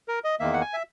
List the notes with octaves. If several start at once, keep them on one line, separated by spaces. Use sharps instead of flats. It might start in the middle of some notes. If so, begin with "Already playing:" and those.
A#4
D#5
E2 D#3 A#3 E5
F#5
G#5
E5